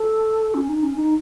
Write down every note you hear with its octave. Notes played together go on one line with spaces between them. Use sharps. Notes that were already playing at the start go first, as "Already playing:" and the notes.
Already playing: A4
C#4
D#4
C#4
D#4